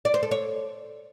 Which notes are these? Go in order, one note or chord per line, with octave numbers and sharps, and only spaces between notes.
D5
C5
A4
C#5